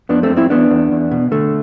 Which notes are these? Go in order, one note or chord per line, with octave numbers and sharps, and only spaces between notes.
F2 B3 D4
A3 C4
F2
C4 E4
E2 B3 D4
E2
E2
B2
D3 A3